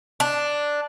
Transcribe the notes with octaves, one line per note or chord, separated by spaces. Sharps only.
D4